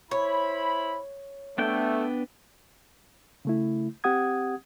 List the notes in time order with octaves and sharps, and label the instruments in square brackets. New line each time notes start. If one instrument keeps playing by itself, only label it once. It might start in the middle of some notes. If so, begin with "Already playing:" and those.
[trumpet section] E4 C5 B5 [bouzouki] C#5
[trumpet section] A3 [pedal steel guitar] B3 D4 G5
[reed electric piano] C#3 A3 E4
C4 G4 F#5 D#6 G#6